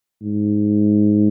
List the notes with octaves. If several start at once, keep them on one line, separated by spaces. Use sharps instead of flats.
G#2